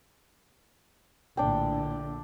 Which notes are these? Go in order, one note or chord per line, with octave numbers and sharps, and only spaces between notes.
A#1 A2 D3 D4 G5